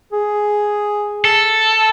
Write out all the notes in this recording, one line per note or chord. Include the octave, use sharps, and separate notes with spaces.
G#4
A4